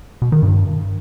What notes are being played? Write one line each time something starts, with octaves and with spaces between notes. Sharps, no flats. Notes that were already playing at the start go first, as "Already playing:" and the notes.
B2
D#3
G2